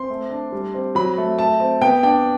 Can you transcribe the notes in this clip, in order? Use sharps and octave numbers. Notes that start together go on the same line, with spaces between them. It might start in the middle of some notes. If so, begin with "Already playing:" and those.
Already playing: C4 C6
A3
D4
G3
C4
F#3 B5
A3
A3 A5
C4
B3 G5
D4 G5